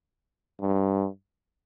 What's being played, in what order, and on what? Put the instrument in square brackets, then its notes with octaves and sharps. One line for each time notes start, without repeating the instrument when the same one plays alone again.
[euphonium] G2